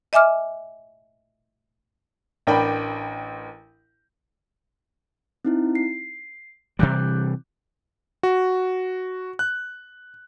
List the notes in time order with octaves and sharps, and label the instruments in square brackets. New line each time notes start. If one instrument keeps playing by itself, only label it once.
[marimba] D#5 E5 G#5 D6 F6
[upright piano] A1 D4 A#4 G5 B5
[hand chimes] C4 D#4 E4
C7
[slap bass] C3 E3 G3 [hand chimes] D6 F#6 G6
[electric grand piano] F#4
F#6